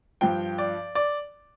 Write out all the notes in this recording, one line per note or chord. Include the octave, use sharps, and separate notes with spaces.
G2 F3 G5
D5
D5